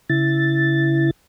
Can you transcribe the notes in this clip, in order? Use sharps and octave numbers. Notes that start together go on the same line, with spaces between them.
C#3 E4 A6